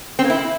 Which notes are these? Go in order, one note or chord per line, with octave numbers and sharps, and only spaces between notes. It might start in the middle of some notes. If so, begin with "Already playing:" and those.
C4
A#3
E4